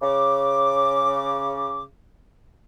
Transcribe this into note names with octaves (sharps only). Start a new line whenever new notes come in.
C#3 D6